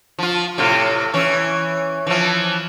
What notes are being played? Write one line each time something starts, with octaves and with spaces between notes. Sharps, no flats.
F3 F4
A2 C3 F4
E3 C#4
E3 F3